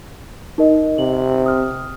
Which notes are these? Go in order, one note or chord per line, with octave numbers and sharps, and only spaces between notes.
D#4 A#4 D#5
C3 F#7
D#6 F6